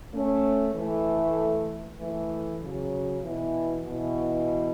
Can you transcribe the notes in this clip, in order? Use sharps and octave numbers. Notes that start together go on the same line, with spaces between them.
A3 C#4
E3 A3
E3 A3
C#3 F#3
B2 E3
B2 E3